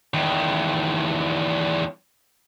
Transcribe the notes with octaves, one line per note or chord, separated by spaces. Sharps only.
E2 D#3